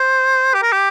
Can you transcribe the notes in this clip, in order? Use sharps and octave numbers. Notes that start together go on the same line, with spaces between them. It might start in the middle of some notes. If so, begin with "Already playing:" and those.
Already playing: C5
G4
A#4
G4